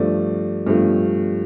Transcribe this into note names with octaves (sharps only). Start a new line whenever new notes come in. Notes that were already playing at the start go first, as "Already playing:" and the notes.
Already playing: G2 F3 A3 D5
G2 F3 A3